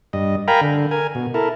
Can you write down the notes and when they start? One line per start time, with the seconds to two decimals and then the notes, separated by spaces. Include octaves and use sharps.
0.13 G2 D#5
0.48 A#4 F5 G5 G#5 A#5 B5
0.61 D3
0.91 A#4 G#5
1.15 B2
1.34 E4 A4 A#4